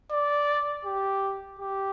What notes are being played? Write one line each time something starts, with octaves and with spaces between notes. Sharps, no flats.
D5
G4
G4